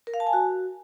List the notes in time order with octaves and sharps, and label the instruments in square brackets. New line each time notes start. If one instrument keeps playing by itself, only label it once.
[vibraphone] A#4
F5
A5
G#5
F#4